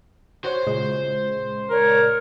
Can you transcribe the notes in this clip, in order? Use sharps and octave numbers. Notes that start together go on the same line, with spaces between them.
F#4 C5 C#5
A#2 C#3 G#3
A#4 C#5 D5